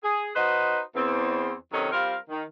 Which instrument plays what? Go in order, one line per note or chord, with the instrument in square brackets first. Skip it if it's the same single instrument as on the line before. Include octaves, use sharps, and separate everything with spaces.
[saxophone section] G#4
D#4 F#4 B4 C5 D#5
E2 C4
C3 D#3 F#3 C#4 D#4 A4
G3 C4 F4 A#4 F5
D#3